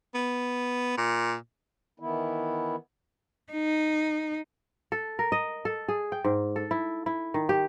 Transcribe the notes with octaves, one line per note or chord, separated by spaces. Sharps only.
B3
A#2
D#3 E3 B3 E4
D#4
A4
A#4
D#5
A4
G#4
G5
G#2
A4
E4
E4
D#3
G4